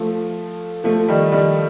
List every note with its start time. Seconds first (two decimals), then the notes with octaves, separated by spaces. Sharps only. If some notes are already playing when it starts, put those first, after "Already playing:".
Already playing: F3 A3
0.84 F3 A3
1.08 D#3 G3
1.32 D#3 G3